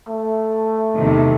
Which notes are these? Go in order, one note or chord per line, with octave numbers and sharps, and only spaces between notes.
A3
E2 C3 D#3